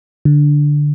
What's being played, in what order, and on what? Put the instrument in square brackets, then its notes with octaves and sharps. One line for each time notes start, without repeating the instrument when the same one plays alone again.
[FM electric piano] D3